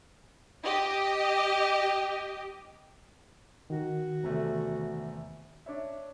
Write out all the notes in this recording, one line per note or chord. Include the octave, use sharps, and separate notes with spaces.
G4 D#5
D#3 F#4
E1 C3 A3
D4 C#5 E5